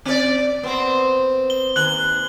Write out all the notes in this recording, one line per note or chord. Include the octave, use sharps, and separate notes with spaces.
C4 D5
B3 C4 C5
G7
D#2 F#6 F#7 G7